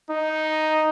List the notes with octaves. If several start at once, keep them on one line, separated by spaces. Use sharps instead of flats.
D#4